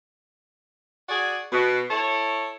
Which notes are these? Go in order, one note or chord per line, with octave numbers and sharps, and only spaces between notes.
F#4 G#4 D5
B2
E4 A4 C#5